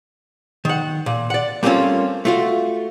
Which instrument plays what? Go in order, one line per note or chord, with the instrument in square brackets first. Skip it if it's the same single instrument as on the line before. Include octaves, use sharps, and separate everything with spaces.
[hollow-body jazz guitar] D#3 F#5
A#2
D5 F#5
G3 A3 A#3 C4 C#4 F4
A3 F4 F#4